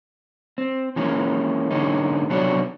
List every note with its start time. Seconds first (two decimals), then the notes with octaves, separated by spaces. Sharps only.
0.58 C4
0.96 E3 G#3 A#3 C#4
1.71 G#2 D3 G#3 A#3 C#4 D#4
2.30 C3 F#3 B3 D4 F#4 C#5